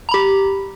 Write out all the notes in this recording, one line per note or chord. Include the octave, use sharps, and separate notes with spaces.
G4 A#5 B5